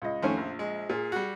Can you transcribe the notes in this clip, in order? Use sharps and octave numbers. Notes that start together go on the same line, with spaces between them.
C#2 D#5
F2 D#3 A3 C#4
A#1
G#3
A#2 G#4
G3 F#4